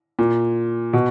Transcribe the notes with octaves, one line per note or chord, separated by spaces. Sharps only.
A#2
B2